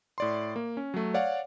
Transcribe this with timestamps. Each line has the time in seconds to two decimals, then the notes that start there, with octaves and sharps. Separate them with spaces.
0.18 A2 D5 C6
0.56 A#3
0.77 C#4
0.94 F#3 A3
1.14 C#5 D5 F5 F#5